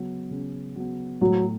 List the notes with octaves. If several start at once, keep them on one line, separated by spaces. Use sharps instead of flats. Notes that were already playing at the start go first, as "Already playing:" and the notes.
Already playing: C#3 F#3 B3
C#3
F#3 B3
A2 F#3